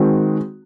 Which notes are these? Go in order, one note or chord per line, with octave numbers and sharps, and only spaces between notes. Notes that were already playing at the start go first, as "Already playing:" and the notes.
Already playing: D#3 G#3 C4 F#4